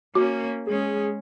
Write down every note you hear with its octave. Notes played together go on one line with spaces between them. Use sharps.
A#3 C#4 F#4
G#3 C#4 G#4